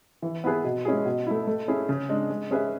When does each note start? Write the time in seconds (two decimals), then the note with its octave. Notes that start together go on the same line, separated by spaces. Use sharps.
0.22 E3
0.44 B3 E4 G#4 B4
0.64 B2
0.85 G#3 C#4 E4 G#4
1.05 B2
1.27 A3 E4
1.47 A3
1.68 C#4 E4 G#4
1.89 C#3
2.09 G#3 D4
2.30 G#3
2.51 C#4 G#4 B4 E5